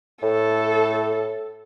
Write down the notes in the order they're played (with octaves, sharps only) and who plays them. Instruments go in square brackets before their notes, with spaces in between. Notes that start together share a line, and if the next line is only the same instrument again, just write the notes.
[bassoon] A2 [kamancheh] A4